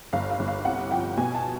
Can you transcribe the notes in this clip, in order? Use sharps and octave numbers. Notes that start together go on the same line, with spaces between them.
G1 F5
F5
G1
F5
C2 F#5
F3 G5
B2 G#5
A5